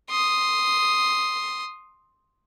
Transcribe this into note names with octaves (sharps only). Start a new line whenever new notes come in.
C6 D#6